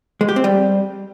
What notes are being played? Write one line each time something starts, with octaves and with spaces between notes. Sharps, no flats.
G#3
G4
C4
G3